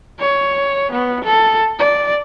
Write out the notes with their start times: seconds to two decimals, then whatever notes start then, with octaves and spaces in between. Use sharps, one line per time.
0.19 C#5
0.92 B3
1.24 A4
1.79 D5